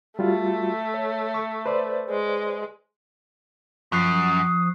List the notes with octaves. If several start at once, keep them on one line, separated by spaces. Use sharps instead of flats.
G3 A3 F4 F#4
C#5
C#6
B4 C5 D5
G#3
F#2 F3 C#6 D#6 F#6 C7